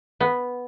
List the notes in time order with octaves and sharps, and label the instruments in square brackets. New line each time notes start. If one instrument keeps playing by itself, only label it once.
[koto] B3